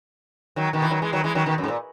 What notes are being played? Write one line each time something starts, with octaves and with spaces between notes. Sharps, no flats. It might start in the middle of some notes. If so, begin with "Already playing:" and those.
D#3 F#3
B2 D#3
E3
D#3 F#3
E3 G#3
D#3 F#3
E3 G#3
D#3 F#3
B2 D#3
F#2
G#2
A#2